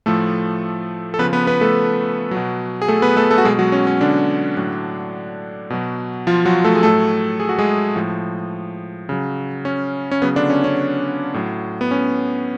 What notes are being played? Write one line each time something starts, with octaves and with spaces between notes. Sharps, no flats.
A2 F3 A3 A4
A4
C#3 F3 B3 B4
B3 B4
B3 B4
A3 A4
F#3
B2
G#4
A3 A4
B3 B4
A3 A4
A3 A4
F#4
B2 F#3 G#3 G#4
F#3 F#4
C#4
C#4
D3 D4
A2 F#3
B2 F#3
F3 F4
F#3 F#4
A3 A4
G#4
A2 F#3 A3 A4
G#4
F#4
G#3 G#4
A2 F3
C#3 F#3
C#4
C#4
C#3 F#3 B3
D3 D4
C#4
C#4
A2 F#3
B3
C#4